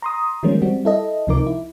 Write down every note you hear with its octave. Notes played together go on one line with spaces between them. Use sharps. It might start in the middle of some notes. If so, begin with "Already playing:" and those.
A#5 C6 D#6
D#3 F3 G3 G#3 A#3 C#4
G3 C4 F#4
E4 A4 D#5
C#2 C3 F3 D#4 A#4 D6
E4